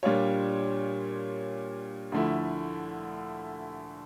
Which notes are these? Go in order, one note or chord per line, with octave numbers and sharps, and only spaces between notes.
A#2 G3 D4 F4 C#5
D2 D3 F3 A3 E4